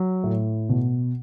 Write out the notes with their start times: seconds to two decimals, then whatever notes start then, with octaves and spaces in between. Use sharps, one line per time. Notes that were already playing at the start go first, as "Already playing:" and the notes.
Already playing: F#3
0.24 A2
0.69 B2